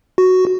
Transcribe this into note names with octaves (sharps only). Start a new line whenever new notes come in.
F#4